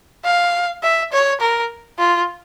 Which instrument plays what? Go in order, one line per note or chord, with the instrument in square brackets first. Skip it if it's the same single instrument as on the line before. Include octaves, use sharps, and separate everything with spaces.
[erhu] F5
E5
C#5
A#4
F4